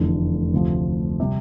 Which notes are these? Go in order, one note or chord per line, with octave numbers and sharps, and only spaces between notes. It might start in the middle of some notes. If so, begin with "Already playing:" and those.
Already playing: F1 E2 D3 A3
D2 C3 F3
C3 G3 C4